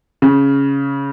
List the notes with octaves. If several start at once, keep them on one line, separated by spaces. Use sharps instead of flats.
C#3